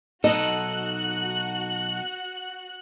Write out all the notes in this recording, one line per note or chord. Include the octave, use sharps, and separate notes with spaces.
B1 D#4 F#4 A4 D#5 F#6